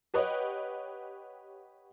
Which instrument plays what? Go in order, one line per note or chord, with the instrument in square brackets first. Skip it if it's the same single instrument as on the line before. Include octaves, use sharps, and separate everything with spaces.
[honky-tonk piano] G4 B4 C#5 D#5 F#5 G5